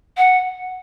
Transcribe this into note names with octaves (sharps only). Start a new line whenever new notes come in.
F#5